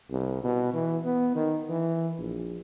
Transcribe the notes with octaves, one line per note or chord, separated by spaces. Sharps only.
C2
B2
E3
B3
D#3
E3
A#1